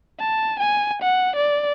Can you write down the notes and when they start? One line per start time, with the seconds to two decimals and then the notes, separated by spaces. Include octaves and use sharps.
0.19 A5
0.60 G#5
1.02 F#5
1.36 D5